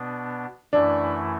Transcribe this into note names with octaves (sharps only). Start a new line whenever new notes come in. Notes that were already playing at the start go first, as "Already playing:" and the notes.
Already playing: B2 B3 D4
F#2 E3 A3 D4 E4